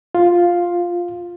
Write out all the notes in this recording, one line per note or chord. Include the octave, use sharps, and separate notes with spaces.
F4